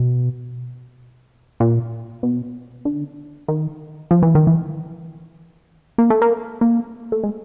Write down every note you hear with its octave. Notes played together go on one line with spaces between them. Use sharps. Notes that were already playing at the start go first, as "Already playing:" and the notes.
Already playing: B2
A#2
B2
D3
D#3
F3
E3
D#3
E3
A#3
A3
A#3
A#3
A3
G#3